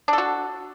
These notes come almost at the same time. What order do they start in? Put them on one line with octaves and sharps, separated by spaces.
D4 A4 F#4